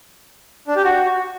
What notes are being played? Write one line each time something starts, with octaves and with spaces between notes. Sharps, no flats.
D4
G4
F#4